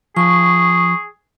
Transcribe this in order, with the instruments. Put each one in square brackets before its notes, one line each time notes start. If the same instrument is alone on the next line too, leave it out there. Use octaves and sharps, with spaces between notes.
[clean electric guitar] F3 [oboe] G#4 [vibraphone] C#6